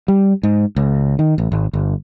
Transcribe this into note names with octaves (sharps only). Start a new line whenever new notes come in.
G3
G#2
C#2
D#3
A1
G#1
G1